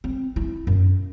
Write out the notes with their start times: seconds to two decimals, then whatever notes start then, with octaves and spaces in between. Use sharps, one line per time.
0.04 C4
0.36 E4
0.67 F#2